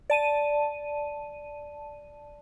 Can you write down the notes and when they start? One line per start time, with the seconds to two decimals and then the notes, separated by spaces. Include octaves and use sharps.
0.10 D5 A5 D#7